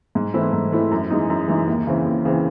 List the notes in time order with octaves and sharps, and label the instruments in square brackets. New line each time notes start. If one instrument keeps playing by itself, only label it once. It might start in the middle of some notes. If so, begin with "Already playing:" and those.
[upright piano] G#2
E3 A3 C4 E4
G#2
E3 A3 C4 E4
F#2
E3 G#3 D#4
F#2
E3 G#3 D#4
D#2
C#3 E3 C4
D#2
C#3 E3 C4